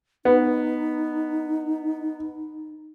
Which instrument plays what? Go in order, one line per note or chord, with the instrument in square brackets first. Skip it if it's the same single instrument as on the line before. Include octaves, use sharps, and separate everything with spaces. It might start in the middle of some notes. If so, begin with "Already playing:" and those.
[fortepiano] B3 [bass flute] D#4